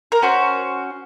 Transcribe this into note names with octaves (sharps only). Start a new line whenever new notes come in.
A#4
C#4 F#4 C5